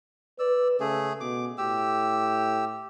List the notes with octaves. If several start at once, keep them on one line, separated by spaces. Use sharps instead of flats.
B4 D5 E6
C#3 A3 G#4
B2 D6
A2 G4 E6